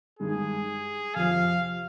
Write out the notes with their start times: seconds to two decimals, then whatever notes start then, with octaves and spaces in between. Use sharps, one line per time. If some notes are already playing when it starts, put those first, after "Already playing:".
0.19 G2 D#3 G#3 G#4
1.16 F2 C3 F3 F5